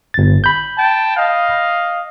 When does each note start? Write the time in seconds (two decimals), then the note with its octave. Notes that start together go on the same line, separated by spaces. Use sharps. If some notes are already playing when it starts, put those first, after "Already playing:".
0.14 G1 A6
0.44 B5 G6
0.77 G5 A5
1.17 D#5 F5